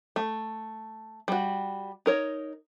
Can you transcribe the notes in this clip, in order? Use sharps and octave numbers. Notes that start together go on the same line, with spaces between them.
A3
G3 F#4
D#4 A#4 C#5